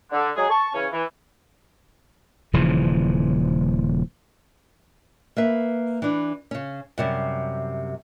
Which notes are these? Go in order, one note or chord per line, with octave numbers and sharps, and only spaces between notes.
D3
F#3 G#3 G#4
A5 C#6
C#3 E3 C#4
E3
D#1 C#3 E3 F3
A#3 B4 E5
E3 D4
C#3 C#4
F#2 C3 G3